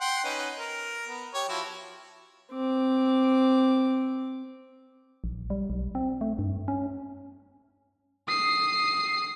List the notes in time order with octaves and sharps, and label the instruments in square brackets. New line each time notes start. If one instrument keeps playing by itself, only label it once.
[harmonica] F#5 G5 C6
C#4 D#4 B4
A#4
B3
G4 C#5
F3 E4 F#4
[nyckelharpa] C4 D6
[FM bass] A#1
G3
B1
C4
A3
G2
C#4
[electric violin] D#6 C7